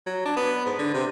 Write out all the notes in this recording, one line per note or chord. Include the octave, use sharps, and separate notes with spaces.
F#3
D4
B3
G#2
D3
C3